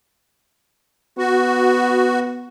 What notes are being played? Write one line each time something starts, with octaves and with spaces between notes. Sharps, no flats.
B3 F#4